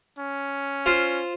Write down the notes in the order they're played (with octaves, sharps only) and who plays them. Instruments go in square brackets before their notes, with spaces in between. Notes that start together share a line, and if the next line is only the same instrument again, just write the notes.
[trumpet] C#4
[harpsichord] F4 C5